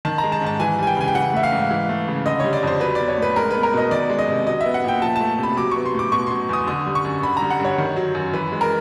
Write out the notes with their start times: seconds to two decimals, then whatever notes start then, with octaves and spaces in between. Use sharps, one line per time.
0.05 D#3 A5
0.18 A#5
0.23 G#3
0.32 A5
0.41 G#2
0.46 A5
0.60 E3 G#5
0.78 G3 G#5
0.87 G5
0.96 C#3 G#5
1.08 G5
1.15 E3 F#5
1.33 A3 E5
1.43 F5
1.52 G#2
1.71 E3
1.89 A3
2.08 C#3
2.26 D3 D#5
2.40 G3 C#5
2.53 D5
2.63 F2 C5
2.81 F#3 B4
2.95 B3 D5
3.08 C#5
3.18 A2 B4
3.36 G#3 A#4
3.51 B3 B4
3.63 A#4
3.73 B2 D#5
3.91 D#3 D5
4.10 G#3
4.19 D#5
4.28 C3
4.47 F#3 D#5
4.61 E5
4.66 B3
4.74 F#5
4.84 A#2 G5
5.02 F3 A5
5.16 A5
5.20 A3
5.38 C3 B5
5.57 F#3 D6
5.71 B3 C#6
5.85 C6
5.95 A2 D6
6.12 B2 C#6
6.27 F#3 C6
6.49 E2 D#6
6.67 D3 D#6
6.86 G3
6.95 C#6
7.05 F#2
7.23 D3 B5
7.37 A#5
7.42 G3
7.51 F#5
7.60 G2 C#5
7.78 D#3
7.96 F#3
8.15 F#2
8.33 E3 B4
8.52 G#3
8.61 A#4